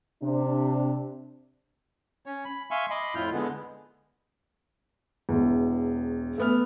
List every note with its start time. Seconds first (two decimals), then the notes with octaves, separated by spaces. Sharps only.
0.22 C3 D4
2.26 C#4 C#5
2.45 B5
2.71 E5 F5 G#5 C6 C#6
2.90 D#5 B5 C6 D6
3.15 F2 A2 E4 F4 F6 G6
3.33 D3 G#3 B3
5.29 E1 E2
6.38 A3 B3 F6